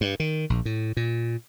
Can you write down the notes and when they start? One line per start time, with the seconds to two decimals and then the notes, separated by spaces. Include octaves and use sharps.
0.01 G2
0.20 D#3
0.50 A#1
0.65 A2
0.97 A#2